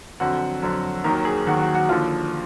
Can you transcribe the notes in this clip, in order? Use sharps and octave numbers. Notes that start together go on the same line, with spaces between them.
F2 D3 F#3 F#4
F2 D3 F#3
D#2 D#3 F#3 A#4
G#4
D#2 D#3 F#3 F#4
F#4
F#4
D#2 D3 F3 F4